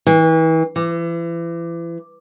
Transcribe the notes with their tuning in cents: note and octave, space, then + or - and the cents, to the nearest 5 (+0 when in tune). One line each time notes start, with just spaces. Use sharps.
E3 -35
E3 +35